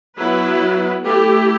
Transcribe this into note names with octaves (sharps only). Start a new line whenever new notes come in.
F#3 B3 E4 B4
A3 E4 G4